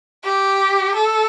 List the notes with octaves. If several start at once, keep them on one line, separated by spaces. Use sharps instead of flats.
G4
A4